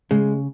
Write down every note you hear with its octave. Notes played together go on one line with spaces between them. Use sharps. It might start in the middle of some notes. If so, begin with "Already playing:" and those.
C#3 G#3